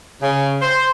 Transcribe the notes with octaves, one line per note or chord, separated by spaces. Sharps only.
C#3
C5